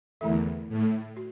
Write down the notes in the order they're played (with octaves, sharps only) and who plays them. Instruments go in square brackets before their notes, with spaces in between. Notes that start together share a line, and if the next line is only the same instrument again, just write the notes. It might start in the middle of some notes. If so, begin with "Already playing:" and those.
[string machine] E2 [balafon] D3 A3 E4 A4 E5
[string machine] A2
[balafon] F#4